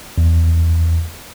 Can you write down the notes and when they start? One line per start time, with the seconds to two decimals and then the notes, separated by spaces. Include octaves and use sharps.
0.18 E2